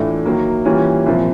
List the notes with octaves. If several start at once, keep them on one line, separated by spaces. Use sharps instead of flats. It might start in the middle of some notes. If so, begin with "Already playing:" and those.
Already playing: A2 E3 A3 D4 F4
D#3 F#3 A#3
E3 G3 A#3 C#4 F4
C2 A#2 F3